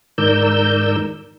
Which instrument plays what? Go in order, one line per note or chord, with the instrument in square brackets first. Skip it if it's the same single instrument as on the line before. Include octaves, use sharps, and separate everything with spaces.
[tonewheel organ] G#2 D#3 A#4 D5 E6 G6